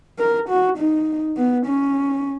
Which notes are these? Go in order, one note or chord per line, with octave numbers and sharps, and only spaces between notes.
A#4
F#4
D#4
B3
C#4